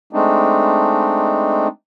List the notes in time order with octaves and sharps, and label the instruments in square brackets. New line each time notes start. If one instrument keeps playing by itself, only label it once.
[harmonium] G#3 A3 C4 D4 D#4